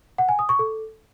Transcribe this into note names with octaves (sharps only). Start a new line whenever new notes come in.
F#5
G#5
D#6
C#6
A4